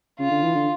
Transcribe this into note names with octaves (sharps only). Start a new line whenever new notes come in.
C#3 F4
D3
E3
D3